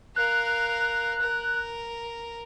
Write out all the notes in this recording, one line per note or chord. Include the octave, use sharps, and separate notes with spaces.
A#4 F5 F#6
A#4